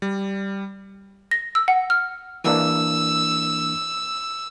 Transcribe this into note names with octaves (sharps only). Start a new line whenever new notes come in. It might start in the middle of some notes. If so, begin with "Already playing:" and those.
G3
A#6
E6
F#5
F6
E3 A#3 D4 E6